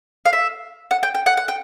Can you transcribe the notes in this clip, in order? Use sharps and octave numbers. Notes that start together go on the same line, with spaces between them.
F5
E5
F#5
G5
G5
F#5
F#5
G5